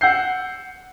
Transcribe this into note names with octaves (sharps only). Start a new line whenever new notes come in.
F#5 E6 G6 C7